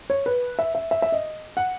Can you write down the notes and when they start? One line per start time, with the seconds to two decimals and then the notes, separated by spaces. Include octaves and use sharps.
0.10 C#5
0.26 B4
0.59 E5
0.75 E5
0.91 E5
1.02 E5
1.12 D#5
1.57 F#5